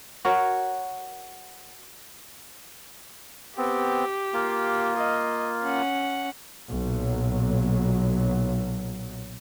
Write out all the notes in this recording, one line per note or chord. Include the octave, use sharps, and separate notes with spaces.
F#4 A#4 C#5
B3 C4 G4
A#3 F4
D#5
C#4 F#5
B1 A#2 F#3